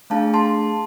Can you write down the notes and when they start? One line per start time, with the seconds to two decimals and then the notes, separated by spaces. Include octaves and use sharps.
0.10 A3 D4 G#4 F5 A5
0.34 A5 C6